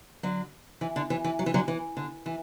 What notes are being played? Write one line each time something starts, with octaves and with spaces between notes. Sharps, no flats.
D3 F#3
E3
D3
E3
E3
F#3
E3
D3 F#3
E3
D3
E3